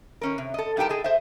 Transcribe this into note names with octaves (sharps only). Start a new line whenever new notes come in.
D#3 C#4 A#4
C3
A4 D#5
G2 D#4 G4 A#4 G5 A5
G#4 A4 D#5
C5 D#5 E5